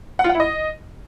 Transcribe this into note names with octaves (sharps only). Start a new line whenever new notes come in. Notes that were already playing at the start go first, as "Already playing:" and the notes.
F#5
F4
F#5
E4
D#5